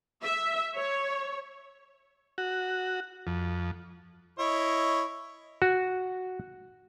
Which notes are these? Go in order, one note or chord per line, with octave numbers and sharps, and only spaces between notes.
E5
C#5
F#4
F2
E4 C#5 D#5
F#4